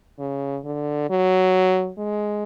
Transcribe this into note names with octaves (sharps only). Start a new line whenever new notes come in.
C#3
D3
F#3
G#3